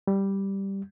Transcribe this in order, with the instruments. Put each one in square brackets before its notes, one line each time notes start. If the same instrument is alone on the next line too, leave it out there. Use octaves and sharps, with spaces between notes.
[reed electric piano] G3